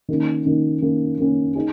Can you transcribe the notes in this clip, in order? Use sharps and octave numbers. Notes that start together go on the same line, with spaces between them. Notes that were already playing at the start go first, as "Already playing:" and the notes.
D#3 A#3 C#4
D#3 A#3 C#4
D#3 A#3 C#4
D#3 A#3 C#4
D#4 G#4